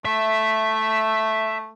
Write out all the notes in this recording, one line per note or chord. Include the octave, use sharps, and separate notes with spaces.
A3 E5